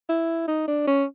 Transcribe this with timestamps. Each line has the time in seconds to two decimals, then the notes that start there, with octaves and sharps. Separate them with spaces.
0.10 E4
0.48 D#4
0.68 D4
0.87 C#4